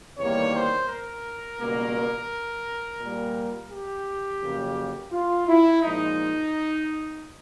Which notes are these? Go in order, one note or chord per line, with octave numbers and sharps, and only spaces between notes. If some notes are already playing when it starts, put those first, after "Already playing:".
E2 C3 D#3 G3 A#3 C#5
C5
A#4
C#2 B2 G3 A#3
A#2 G3 A#3
G4
F2 C#3 F#3 A#3
F4
E4
A#2 F3 G#3 D#4